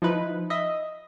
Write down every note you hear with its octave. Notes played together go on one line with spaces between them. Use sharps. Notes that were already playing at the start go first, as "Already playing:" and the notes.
F3 D#4 E4 B4
D#5 E5